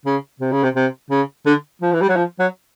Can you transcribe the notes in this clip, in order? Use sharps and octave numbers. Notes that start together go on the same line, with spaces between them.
C#3
C3
C#3
C3
C3
C#3
D3
F3
E3
G3
F#3
F3
F#3